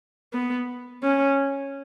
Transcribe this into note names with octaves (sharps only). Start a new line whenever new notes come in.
B3
C#4